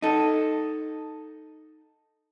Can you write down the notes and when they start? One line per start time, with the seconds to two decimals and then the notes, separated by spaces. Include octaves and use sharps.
0.02 D#4 A4